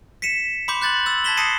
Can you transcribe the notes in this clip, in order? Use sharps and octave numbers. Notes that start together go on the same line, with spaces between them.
B6 C#7 D#7 E7
B5 C6 D6 G6
F#6 G6 A6 F#7
E6 G6 A6 F#7
A5 G#6 A#6 B6 E7 G7
A5 D#6 A#6 C7 C#7 D#7